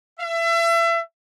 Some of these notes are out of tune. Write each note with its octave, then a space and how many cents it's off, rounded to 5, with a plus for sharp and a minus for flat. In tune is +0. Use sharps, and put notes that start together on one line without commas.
E5 +30